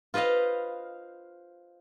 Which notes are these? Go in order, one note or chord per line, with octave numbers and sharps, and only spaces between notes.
F4 B4 C5 D#5 F5